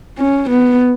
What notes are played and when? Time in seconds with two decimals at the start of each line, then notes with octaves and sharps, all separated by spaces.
0.18 C#4
0.50 B3